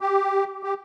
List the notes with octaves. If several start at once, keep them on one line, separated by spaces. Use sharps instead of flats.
G4
G4